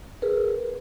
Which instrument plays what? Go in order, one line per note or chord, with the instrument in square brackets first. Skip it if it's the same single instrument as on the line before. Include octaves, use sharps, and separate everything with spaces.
[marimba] G#4 A#4 B4